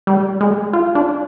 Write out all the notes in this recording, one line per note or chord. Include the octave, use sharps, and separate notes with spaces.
G3
G#3
F4
D4